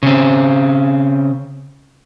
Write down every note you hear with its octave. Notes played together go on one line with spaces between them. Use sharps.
C#3 C4